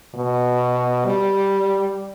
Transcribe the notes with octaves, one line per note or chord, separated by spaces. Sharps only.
B2
G3